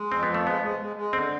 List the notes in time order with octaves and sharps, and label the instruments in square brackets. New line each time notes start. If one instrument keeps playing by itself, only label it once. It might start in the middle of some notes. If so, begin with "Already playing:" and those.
Already playing: [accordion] G#3
[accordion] F2 [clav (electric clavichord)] C4
[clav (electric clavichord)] B3
[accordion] F3
[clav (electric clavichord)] A3
[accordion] G#3 [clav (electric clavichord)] B3
[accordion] G#3
G#3
G#3
[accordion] D3 [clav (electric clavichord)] C4